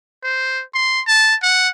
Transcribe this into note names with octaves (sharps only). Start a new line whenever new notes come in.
C5
C6
A5
F#5